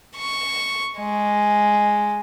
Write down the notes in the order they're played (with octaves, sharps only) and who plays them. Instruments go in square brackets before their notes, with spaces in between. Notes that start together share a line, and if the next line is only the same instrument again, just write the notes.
[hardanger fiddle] C#6
G#3